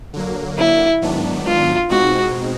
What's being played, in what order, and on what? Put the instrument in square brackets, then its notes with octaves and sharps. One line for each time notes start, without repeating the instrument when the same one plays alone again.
[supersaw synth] D3 F#3 A#3
[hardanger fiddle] E4
[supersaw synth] G#2 D#3 F#3 B3 D4
[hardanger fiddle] F4
[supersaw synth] B2 G#3 C4 D#4 [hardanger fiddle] F#4